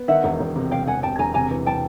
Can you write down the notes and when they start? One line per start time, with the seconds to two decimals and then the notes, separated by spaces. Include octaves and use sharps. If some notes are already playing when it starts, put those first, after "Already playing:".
Already playing: B3
0.08 D#3 E5 F#5
0.24 E1
0.40 E1
0.56 C3
0.71 C3 F5 G5
0.87 E1 F#5 G#5
1.03 C3 G5 A5
1.19 E1 G#5 A#5
1.34 C3 G#5 A#5
1.51 E3
1.66 C3 G5 A5